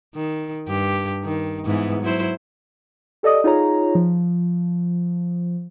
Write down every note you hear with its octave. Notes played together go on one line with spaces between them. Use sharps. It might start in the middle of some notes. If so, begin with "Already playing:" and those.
D#3
G2 G4
D#3
G#2 E3 B3
F#3 E4 C5
G4 A4 D5 D#5 D#6
D#4 F4 G#4 C#5 A#5
F3